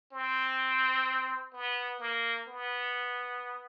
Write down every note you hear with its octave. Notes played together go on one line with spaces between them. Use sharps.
C4
B3
A#3
B3